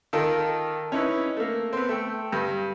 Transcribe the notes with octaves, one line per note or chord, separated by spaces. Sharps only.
D#3 F4 A4 A#4 G5
C#4 D#4 E4 B4
A3 A#3
B3 C4
A3 G5
G2